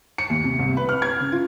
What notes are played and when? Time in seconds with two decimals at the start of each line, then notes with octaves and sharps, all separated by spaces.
0.18 C#7
0.30 D#2
0.44 C3
0.59 C2
0.77 B4
0.89 F6
1.02 G#6
1.20 C#3
1.32 F4